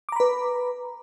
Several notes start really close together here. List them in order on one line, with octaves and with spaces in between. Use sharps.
D6 A#5 B5 B4